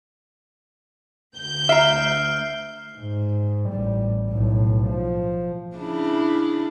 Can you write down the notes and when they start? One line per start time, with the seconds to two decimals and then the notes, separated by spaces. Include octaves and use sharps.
1.37 D2 G6
1.69 E5 A#5 F6 C7 D7
2.98 G#2
3.70 A1 G3
4.30 B1 A2
4.88 F3
5.76 C#3 D4 E4